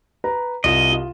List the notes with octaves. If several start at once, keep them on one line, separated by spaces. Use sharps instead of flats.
B4 A#5
C2 F4 D#5 E7
F4